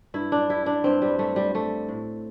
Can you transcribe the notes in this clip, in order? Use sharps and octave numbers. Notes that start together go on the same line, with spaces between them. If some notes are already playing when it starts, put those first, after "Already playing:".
G2 E4
D4
G3 E4
D4
G2 C4
G3
G3 A3
G3
G3 A3
A2